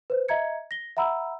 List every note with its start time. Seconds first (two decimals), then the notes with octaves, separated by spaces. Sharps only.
0.10 B4 C5
0.29 D#5 E5 A#5 G#6 C#7
0.71 A#6 G7
0.97 E5 F#5 A#5 B5 E6